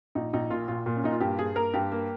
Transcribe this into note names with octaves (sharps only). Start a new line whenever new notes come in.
A#1 D#4
A#1 D#4
A#2 F4
A#2 F4
A#2
C#4
A#2 D#4
F4
G2 G4
G2 G#4
A#3 A#4
G2 G4
A#3